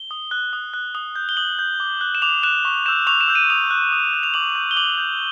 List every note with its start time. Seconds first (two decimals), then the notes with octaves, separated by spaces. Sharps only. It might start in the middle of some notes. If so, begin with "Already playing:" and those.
Already playing: G7
0.11 D#6
0.31 F#6
0.53 D#6
0.74 F#6
0.95 D#6
1.16 G6
1.29 G7
1.37 D#6 F#7
1.59 G6
1.80 D6
2.01 F#6
2.15 E7
2.22 D6 F7
2.43 F#6 E7
2.65 C#6
2.86 E6 G6 E7
3.07 C#6 F7
3.21 E7
3.28 E6 G6
3.35 D#7
3.50 D#6 F7
3.71 F#6
3.92 D#6
4.13 F#6
4.23 F7
4.34 D6 F#7
4.55 G6
4.71 G7
4.76 D6 F#7
4.98 G6